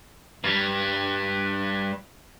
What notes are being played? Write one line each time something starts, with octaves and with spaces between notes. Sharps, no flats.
G2 G3